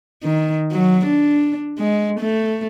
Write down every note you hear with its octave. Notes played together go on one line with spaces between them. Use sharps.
D#3
F#3
D4
G#3
A3